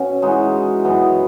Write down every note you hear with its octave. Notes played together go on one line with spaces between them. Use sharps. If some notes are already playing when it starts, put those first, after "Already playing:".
Already playing: B2 C#4
E3 G#3 D#4 F#4
F#2 E3 B3 D#4